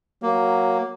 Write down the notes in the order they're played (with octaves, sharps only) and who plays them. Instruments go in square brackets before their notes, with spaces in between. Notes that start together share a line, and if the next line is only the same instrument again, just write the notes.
[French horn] F#3 [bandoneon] A#3